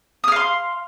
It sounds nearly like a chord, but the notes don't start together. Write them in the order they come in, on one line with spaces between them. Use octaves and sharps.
D#6 F6 F5 C6